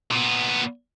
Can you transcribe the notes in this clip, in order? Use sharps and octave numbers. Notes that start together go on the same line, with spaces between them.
A#2 B3